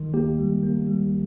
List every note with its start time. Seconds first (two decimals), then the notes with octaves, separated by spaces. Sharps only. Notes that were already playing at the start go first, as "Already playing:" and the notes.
Already playing: D#3
0.14 A#3 G4
0.39 G3
0.63 A#3
0.87 G3